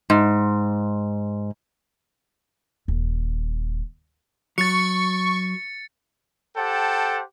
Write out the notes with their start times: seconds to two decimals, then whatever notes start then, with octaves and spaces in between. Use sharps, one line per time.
0.10 G#2
2.88 D#1
4.58 F#3 C#6 A6 C#7
6.56 G4 A4 C5 F#5 G5 A5